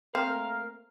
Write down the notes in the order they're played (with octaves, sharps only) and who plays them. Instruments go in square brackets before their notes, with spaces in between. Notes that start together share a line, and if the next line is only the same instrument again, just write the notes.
[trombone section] A3 A#3 A#4 [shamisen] C4 [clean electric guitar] F5